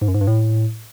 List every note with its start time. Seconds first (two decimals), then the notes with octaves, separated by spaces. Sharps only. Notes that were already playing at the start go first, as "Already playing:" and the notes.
0.01 G#2
0.08 F#2
0.14 G#2
0.21 G2
0.27 A2